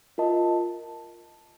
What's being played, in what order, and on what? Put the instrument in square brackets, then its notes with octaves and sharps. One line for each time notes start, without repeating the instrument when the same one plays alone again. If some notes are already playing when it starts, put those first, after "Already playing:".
[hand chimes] F4 A#4 D#5 A5